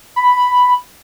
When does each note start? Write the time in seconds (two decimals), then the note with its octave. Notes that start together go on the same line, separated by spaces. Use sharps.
0.16 B5